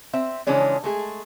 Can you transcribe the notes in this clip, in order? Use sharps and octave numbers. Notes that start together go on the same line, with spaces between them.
C4 E5
C#3 E3 F3 G#3 C#4 D4
G#3 A3 G#4